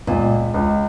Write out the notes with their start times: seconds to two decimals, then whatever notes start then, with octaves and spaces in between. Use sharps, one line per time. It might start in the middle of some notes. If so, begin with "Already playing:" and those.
0.07 C#2 A#2
0.54 C#2